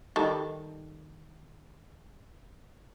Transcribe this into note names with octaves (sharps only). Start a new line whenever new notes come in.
D#3 G3 A4